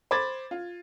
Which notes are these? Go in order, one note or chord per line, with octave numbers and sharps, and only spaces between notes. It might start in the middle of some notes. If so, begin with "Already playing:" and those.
C5 B5 D6 G#6 A6
F4